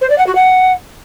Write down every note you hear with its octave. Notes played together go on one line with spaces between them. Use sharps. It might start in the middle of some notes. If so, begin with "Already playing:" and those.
C5
D5
F#5
F#4
F#5